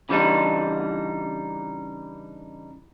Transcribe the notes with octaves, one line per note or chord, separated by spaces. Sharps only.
C#3 E3 G3 D4 D#4